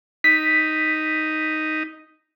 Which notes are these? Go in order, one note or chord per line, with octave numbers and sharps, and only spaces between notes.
D#4 B6